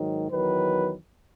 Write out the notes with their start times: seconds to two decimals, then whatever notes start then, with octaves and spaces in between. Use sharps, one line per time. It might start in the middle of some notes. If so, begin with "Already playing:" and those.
Already playing: G#2 D#3 F#3
0.31 E2 D#3 F#3 B4